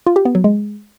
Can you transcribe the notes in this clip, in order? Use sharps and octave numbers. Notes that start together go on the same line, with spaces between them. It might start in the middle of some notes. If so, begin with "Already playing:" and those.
F4
G4
B3
F#3
G#3